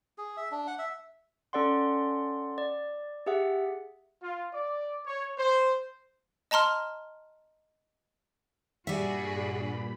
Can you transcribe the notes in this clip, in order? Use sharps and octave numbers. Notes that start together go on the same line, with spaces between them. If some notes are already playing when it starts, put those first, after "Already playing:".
G#4
E5
D4
F#5
E5
C#4 A4 D5 F#5 C6
D5
G4 G#4 E5 F#5
F4
D5
C#5
C5
D#5 A5 A#5 C6 F6
G2 A#2 G3 F#4 G#4 D5 E5 B5